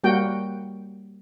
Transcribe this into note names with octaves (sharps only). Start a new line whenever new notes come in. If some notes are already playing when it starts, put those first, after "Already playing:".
G3 A#3 F#4 G5